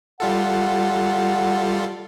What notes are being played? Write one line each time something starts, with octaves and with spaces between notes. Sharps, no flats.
G3 F4 A4 F#5